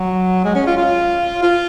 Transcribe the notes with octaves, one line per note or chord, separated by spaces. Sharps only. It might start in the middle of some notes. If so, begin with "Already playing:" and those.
Already playing: F#3
G#3
C#4
F4
F4
F4